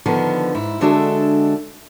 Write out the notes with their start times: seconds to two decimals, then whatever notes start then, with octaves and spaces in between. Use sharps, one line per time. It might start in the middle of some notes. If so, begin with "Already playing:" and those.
0.06 D3 D#3 F3 B3
0.55 G#2 E4
0.81 D3 G#3 D4 F#4 A4 E5